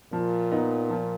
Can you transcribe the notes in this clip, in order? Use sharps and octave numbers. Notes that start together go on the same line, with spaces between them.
A#2 F3
B3 D#4
F3